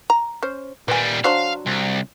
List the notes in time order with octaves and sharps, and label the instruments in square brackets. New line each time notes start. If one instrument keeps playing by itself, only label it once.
[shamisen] A#5
C#4 C5
[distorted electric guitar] A#2 G3 [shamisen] B4 G#5
[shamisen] F#3 D4 C5 [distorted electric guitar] F5
[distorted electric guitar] C2